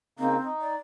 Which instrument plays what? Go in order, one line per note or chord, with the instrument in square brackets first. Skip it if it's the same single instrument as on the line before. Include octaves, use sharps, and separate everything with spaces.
[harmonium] C#3 A#3 D#4 [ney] C4
[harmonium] D#4
[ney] D5